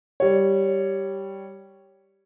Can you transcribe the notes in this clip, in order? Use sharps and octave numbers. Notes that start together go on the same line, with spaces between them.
G3 C#5